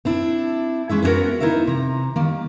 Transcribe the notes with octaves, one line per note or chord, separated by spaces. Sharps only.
C4 D4 E4
G#3 C#4 E4 E5
B3 C#4 D4 F#4 A#4
B3 D#4 E4 A#4 C5 E5
C3 A#5
D#3 G3 A#3